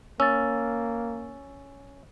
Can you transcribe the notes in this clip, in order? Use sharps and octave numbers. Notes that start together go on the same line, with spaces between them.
A#3 C#4 E6 A6